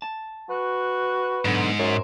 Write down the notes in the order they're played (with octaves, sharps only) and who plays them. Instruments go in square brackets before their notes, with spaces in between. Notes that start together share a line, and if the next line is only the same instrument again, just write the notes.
[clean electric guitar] A5
[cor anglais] F#4 [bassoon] B4
[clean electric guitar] B1 D3 B3 [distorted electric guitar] G#2
[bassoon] F#2 [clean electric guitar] A#4 C5